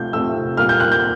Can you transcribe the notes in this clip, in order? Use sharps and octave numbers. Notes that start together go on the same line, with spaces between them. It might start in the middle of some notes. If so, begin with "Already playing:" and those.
Already playing: C3 F3 A3 G6
C3 F3 A3 E6
A#2 G3 A#3 F6
G6
F#6
G6